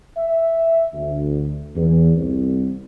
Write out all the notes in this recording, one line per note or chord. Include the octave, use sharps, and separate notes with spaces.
E5
D2
E2
C2